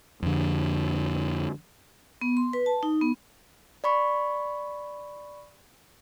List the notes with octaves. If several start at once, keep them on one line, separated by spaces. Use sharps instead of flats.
F2 D3
B3
C6
B4
A5
D#4
B3
D5 B5 C#6